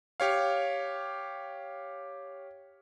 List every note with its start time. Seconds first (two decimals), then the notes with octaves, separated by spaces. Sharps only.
0.20 G4 C#5 F5